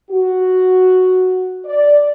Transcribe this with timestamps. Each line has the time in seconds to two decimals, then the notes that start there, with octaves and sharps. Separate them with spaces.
0.11 F#4
1.65 D5